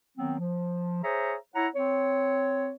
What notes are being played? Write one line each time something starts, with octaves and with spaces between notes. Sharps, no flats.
D#3 F#3 B3 C4
F3
G#4 C5 C#5 E5 A#5
E4 C#5 F#5 A#5
C4 C#5